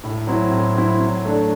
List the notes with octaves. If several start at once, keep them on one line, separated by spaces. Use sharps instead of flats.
A2
F#3 C4 E4
A2
F#3 C4 E4
F#3
A3 D4